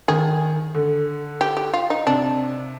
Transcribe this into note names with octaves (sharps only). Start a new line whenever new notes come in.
D#3 G#4
D3
G4
G4
F4
D#4
C3 D4